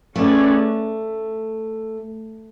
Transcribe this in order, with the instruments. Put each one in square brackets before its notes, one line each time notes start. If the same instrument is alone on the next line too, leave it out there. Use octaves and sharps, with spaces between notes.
[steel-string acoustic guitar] A3 [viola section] C#4 G#4 B4 D5